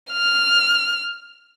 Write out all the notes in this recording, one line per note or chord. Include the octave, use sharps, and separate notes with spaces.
F6